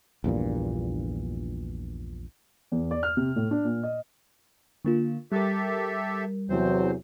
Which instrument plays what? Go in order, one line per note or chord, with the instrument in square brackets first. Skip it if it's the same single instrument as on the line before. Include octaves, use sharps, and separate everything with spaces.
[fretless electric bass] A#1 E2 G2 A#2
[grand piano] E2
D5
F6
C3
A2
D4
A#2
D#5
[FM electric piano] D3 A#3 F4
[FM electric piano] G3 A#4 [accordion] G4 A4 E5
[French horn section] E2 C3 F#3 [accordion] C4 C5